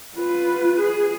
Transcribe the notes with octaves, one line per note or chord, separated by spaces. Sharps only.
F4 B4
G#4